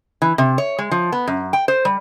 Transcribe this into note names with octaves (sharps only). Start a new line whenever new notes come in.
E3
C3
C#5
G#3
F3
B3
F#2
G5
C5
G3